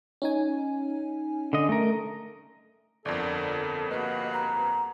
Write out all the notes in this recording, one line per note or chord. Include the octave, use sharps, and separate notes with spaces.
C#4 D#4 G#5
D3 D#5
A3 A#4
G1 F2 D3 A4 A#4 D5
A#3 F#4 G4 B4 D#5
A#5